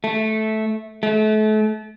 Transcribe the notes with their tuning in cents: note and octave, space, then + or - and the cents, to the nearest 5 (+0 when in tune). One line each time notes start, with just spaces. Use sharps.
A3 -10
A3 -35